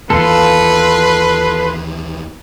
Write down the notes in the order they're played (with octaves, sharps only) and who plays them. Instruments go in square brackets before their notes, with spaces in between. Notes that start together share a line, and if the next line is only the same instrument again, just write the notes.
[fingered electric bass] D#2 E3 B3 [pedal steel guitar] F4 A4 [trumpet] B4 [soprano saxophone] C6